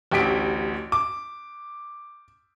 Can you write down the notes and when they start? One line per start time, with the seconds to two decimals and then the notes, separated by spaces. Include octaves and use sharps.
0.12 A1 D2 G4 B6 D7
0.92 D6